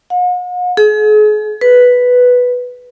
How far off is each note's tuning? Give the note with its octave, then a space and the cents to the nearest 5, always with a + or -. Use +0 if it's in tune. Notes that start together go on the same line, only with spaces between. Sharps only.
F#5 -45
G#4 +40
B4 +0